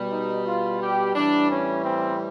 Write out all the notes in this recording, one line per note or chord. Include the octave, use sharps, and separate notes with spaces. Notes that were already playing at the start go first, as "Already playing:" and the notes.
Already playing: B2 G3
D#4
F4
G4
A2 E3 G3 D4
C#4
C4